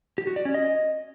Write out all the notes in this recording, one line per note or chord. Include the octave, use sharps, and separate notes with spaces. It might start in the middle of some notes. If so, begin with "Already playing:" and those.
G4
F#4
D5
C#4
D#5